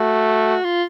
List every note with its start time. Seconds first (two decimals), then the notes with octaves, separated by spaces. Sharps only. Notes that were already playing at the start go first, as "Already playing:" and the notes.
Already playing: A3 F#4
0.64 F4